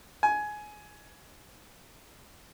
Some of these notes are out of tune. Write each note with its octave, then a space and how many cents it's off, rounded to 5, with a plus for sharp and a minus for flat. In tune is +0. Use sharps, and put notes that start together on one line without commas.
G#5 +15